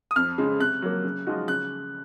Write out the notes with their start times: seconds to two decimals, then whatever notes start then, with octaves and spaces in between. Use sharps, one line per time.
0.11 D#6
0.16 F2 F6
0.38 C#3 G#3
0.60 C3 F#6
0.82 F#3 A#3
1.04 C#3
1.27 F3 G#3 D#4 F#4
1.48 C#3 F#6